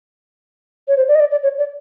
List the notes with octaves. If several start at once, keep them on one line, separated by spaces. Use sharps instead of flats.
C#5
C5
D5
D#5
D5
D5
C#5
D5